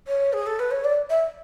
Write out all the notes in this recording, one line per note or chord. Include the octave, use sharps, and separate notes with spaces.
C#5
G#4
A4
B4
C#5
D5
E5